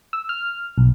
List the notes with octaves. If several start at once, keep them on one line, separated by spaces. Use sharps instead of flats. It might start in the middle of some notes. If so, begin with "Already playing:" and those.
E6
F6
B1